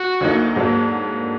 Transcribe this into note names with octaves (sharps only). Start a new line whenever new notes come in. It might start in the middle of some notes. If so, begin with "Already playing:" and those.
Already playing: F#4
D2 D3 F#3 A#3 D#4
G#2 F#3 A#3 D4